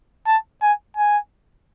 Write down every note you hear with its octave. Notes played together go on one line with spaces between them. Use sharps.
A5
G#5
G#5